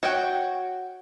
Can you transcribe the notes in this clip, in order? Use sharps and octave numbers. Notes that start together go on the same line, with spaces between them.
F#4 C#5 F#5 G5